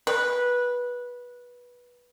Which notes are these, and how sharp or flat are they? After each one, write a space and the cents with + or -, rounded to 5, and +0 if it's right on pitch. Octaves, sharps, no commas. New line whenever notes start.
B4 -15